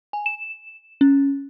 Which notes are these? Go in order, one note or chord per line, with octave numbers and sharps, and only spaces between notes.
G#5
E7
C#4